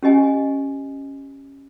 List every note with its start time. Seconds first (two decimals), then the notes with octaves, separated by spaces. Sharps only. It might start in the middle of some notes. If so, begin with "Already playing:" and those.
0.03 C#4 G4 D#5 G#5